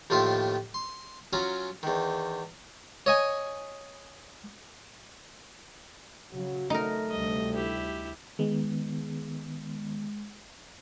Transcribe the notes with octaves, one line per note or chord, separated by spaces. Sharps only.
D#2 A2 F3 F4 E5 C6
C6
F#3 C#4 F4 G#5 A#5
E2 D#3
C#5 D#5 G#5
C#3 F#3 F#4
A3 D#4 A#4
D2 C3 G3 D#5
E4 G4
D#3 G#3 B3